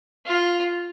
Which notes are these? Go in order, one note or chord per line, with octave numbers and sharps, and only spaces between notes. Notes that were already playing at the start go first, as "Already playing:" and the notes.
F4